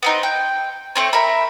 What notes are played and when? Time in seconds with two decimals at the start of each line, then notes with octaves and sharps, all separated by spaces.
0.03 B3 C4 D#4
0.23 G5
0.95 A3 C4 C#5
1.13 A#4 E5 B5